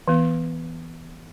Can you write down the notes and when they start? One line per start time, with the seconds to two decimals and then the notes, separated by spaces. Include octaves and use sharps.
0.08 E3 B3